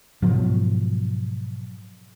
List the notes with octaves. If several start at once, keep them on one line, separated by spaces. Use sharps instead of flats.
G#2 B2 F3 F#3